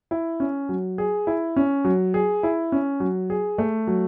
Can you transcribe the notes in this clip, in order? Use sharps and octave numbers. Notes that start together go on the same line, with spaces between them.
E4
C#4
F#3
G#4
E4
C#4
F#3
G#4
E4
C#4
F#3
G#4
A3
F#3